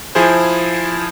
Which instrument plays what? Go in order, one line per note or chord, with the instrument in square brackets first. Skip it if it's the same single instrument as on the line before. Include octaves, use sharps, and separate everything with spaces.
[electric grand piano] F3 E4 G#4 C5